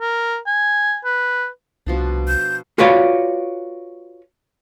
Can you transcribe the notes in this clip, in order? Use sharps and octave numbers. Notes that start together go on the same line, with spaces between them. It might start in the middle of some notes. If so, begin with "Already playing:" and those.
A#4
G#5
B4
C2 B2 F3 D4
G6
F4 F#4 B4 C#5 D5 F5